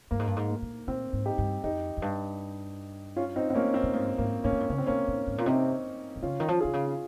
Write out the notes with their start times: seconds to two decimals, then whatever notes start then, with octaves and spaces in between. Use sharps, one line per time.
0.11 G2 A#3
0.19 G#2
0.27 G2
0.36 G#2
0.49 A#3
0.62 A#2
0.87 A#2 C4
1.13 G#2
1.25 D#4 G4
1.38 G2
1.64 F2 D#4 G4
1.97 F2
2.02 G2
3.16 C#4 F4
3.36 C4 D#4
3.50 C4
3.55 A#3 C#4
3.74 C4
3.83 A#2
3.93 G#2 A#3
4.18 G#2 A#3
4.44 G#2 A#3 C#4
4.52 A#2
4.60 G#2
4.70 C#3 C#4
4.78 C4
4.86 C3 A#3 C#4
5.08 A#2
5.27 G#2
5.38 A#2
5.46 C3 C4 D#4
6.16 D#3
6.22 C#3 C#4 F4
6.40 D#3
6.48 F3
6.60 C3 F4 G#4
6.73 C#3